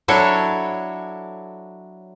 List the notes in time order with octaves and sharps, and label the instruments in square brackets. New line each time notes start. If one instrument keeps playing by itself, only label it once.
[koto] F#3 D4 E4 A4 C#5